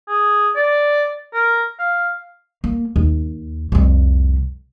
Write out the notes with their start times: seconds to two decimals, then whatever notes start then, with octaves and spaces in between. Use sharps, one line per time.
0.08 G#4
0.56 D5
1.34 A#4
1.79 F5
2.64 A#3
2.96 D#2
3.72 C2 F2